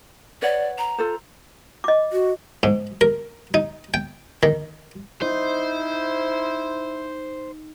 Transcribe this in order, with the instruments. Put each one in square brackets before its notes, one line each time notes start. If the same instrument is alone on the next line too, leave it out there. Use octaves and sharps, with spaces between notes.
[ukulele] B4 C#5 F#5 [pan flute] D5
[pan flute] A#5
[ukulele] F4 A4 C5
[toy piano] D#5 D6
[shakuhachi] F#4
[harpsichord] G#2
A#4
D#4
G5
D#3
[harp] D#4 [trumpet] E4 [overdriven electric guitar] C5